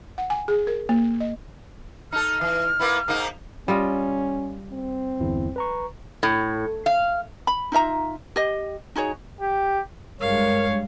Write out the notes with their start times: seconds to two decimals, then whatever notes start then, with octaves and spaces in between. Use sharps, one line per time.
0.18 F#5
0.30 G#5
0.48 G#4
0.67 A#4
0.89 A#3
1.20 D#5
2.12 D#4 A4 F6
2.41 E3
2.79 A#3 B3 E4
3.08 G#2 A#3 D#4
3.68 G3 C#4 F4 D#5
4.71 C4
5.20 G1 E2 E4
5.56 B4 A#5 C#6
6.23 A2
6.86 F5
7.47 B5
7.72 D#4 F4 E5 A#5
8.36 G4 D#5
8.95 D#4 F#4 G#4 C#5
9.41 G4
10.21 G2 G#3 A#4 C#5 F5